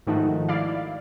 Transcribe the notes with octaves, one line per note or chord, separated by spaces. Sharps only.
G#2 D#3 F3 A3 D#4 F#4
E4 D5 F5